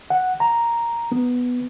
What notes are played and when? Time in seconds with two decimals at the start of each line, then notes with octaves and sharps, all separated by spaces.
0.10 F#5
0.40 A#5
1.12 B3